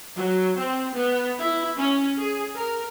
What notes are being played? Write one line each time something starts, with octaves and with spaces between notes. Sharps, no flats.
F#3
C4
B3
E4
C#4
G#4
A#4